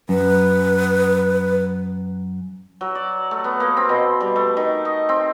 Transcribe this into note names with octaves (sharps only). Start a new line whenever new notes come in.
F#2 B4
F#3
D5
A3
B3
A#3
C4
B2
G3
A3
D#3
D#5
C4